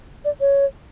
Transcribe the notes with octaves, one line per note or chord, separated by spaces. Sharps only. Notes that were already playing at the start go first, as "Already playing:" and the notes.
D5
C#5